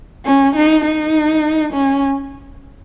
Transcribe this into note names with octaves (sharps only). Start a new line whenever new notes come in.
C#4
D#4
D#4
C#4